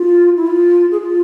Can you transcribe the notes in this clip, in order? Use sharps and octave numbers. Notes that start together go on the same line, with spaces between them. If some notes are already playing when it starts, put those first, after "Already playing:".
Already playing: F4
E4
F4
G#4
F4